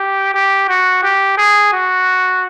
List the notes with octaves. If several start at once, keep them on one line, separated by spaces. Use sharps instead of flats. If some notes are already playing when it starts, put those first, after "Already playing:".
Already playing: G4
G4
F#4
G4
G#4
F#4